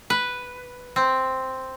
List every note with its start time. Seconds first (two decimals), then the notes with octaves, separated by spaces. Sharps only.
0.10 B4
0.96 C4